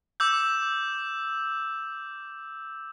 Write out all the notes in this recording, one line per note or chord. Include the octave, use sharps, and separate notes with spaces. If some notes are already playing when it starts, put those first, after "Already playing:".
D6 E6 G6